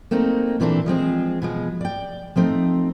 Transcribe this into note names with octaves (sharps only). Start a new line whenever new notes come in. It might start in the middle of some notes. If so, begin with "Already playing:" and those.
A3 A#3 C4 D#4
A#2 E3 C4 D4 A4
F3 G#3 C4 G#4
B2 F3 G#3
D5 G5
F3 A3 C4 D#4